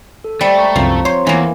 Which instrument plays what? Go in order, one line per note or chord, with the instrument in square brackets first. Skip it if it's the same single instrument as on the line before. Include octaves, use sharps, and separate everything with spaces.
[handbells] A4
[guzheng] G3 [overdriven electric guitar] A3 [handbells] C5 D5 C#6
[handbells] A#5 C#6
[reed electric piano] C2 F#2 [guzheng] F3 [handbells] C4 A#5
[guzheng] C5 [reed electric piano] C#5
[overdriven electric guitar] E2 [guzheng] E3 A#3